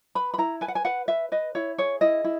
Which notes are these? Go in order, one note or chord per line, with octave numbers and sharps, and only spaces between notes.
B4 B5
B5
E4 A#5
B4 G#5
F#5
G#5
B4 F#5
B4 E5
B4 D#5
E4 C#5
G#4 C#5
E4 D#5
E4